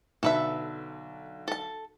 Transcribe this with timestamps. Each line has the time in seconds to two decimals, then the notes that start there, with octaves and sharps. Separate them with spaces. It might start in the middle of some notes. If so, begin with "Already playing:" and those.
0.23 B1 D3 A4 B4 E5 B6
1.48 A4 A5